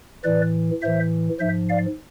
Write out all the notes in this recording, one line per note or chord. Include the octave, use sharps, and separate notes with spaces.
A2 E3 B4 D5
A2 E3 C5 E5
G#2 F3 C5 E5
D5 F5